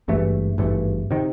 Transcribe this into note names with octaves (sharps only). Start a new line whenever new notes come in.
G#1 G2 E3 A3
G#1 G2 E3 A3
C3 D#3